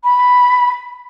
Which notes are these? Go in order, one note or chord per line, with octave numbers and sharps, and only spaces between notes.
B5